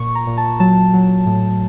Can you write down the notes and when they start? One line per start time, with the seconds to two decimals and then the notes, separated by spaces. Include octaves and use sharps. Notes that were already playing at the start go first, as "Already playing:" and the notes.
Already playing: A#2 C#6
0.15 A#5
0.27 A#2
0.37 A5
0.60 F#3 A5
0.94 F#3
1.26 A2